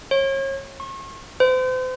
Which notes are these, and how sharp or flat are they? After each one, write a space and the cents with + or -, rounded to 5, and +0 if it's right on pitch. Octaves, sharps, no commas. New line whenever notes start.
C#5 -35
C#6 -40
C5 -40